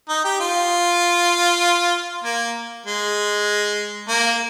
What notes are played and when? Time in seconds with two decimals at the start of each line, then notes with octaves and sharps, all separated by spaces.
0.09 D#4
0.24 G4
0.40 F4
2.24 A#3
2.86 G#3
4.08 A#3